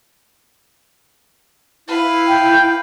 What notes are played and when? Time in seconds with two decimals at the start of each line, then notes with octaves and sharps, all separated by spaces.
1.88 E4 B4 F5
2.27 G5